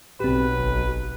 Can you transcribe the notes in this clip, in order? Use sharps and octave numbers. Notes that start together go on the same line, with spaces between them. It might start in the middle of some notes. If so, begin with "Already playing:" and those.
B1 C4 G4 B4
G#1